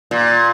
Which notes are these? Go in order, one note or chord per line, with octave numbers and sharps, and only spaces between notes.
A#2